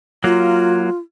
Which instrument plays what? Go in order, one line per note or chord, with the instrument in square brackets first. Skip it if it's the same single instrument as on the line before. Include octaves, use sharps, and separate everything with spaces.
[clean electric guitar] F#3 A#3 [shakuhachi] F4